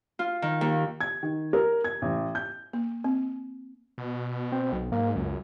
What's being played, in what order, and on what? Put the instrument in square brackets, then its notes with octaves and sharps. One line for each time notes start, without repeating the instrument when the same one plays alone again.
[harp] F4
D#3
D#2
[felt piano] G#6
D#3
A#4
G#6
A1
G6
[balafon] A#3
C4
[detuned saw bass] B2
[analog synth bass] C4
B1
[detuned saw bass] G#2 [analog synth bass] A#3
[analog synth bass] C#2 [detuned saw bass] F#2